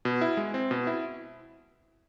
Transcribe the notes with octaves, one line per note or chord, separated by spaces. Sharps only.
B2
E4
G#3
C4
B2
E4